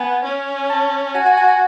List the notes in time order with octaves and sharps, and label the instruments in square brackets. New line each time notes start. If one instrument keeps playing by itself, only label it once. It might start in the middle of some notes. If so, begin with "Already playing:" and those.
Already playing: [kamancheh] B3 [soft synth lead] G#5
[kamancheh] C#4
[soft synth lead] A5
[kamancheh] F#4 [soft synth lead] G#5
[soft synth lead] G#5
G#5
G#5